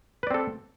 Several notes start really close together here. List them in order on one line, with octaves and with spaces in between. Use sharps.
B4 D5 C4 A4